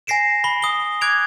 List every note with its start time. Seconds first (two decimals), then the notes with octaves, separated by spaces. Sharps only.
0.07 G#5 A#6 C7 D7 E7
0.44 B5 C7 G7
0.62 D#6 G7
1.01 D6 F#6 G#6 D7 F7